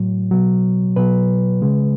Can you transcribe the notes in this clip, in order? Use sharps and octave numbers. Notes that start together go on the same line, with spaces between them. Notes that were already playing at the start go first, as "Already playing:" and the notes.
Already playing: A2 F#3
B2 F#3
B2 F#3 B4
C#3 G#3